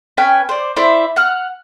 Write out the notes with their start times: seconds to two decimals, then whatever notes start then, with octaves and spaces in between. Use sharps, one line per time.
0.17 C#4 B4 G5 G#5
0.49 C5 D5
0.76 E4 C5 D5 E5
1.16 F#5 F6